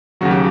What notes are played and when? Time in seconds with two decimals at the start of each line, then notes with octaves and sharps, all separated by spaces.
0.21 D#2 C#3 F#3 F#4
0.31 G4